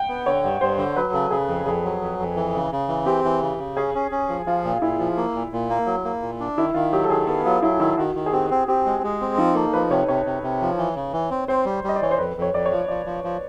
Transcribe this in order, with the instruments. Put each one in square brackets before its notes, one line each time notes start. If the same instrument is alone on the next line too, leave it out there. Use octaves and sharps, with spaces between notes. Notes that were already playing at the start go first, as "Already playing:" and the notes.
Already playing: [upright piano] F#5 G5
[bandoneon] B3
[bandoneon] D3 [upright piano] C#5
[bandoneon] G2
[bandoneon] G2 [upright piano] C5
[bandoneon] D3
[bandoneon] F#3 [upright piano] B4
[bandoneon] C#3 [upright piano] A4
[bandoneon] C#3 [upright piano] G#4
[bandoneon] F2
[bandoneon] F2 [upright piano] G#4
[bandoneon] F#3
F2
F2
E3
C#3
C#3
E3
[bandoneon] C4 [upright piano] G4
[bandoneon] E3
C#3
C#3
[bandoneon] C#4 [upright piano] G#4
[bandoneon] C#4
C#4
F3
[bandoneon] F3 [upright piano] F4
[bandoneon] A#2
[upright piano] F4
[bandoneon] A#2 [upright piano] E4
[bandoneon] F3
A#3
A#2
A#2
A#3
F#3
A#3
A#2
D4
[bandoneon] D#3 [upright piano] E4
[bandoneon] D#3 [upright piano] F4
[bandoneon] F#3 [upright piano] G4
[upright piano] A4
[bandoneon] D#3 [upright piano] G#4
[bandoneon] B3 [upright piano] A4
[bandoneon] F#3 [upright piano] F4
[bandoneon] F#3 [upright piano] E4
[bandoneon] D#3 [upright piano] E4
[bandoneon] D#3 [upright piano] F#4
[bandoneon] D#3
[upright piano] G#4
[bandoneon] C4 [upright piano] G4
[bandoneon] C4
[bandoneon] C4 [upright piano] G4
[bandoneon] G#3
G#3
C4
[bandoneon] F3 [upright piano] D#4
[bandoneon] A#3 [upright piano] A4
[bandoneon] F3 [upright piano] B4
[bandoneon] C3 [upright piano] C#5
[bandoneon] C3 [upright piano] C#5
[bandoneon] C3
C3
F3
E3
C#3
E3
C4
[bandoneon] C4 [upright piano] C5
[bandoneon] G3
[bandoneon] G3 [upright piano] D#5
[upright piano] D5
[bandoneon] E3 [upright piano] C#5
[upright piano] C5
[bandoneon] F2 [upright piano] B4
[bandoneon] F2
[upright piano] C#5
[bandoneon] F2 [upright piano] D5
[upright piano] C#5
[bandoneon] F3
[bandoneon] F3 [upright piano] D5
[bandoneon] F3
F3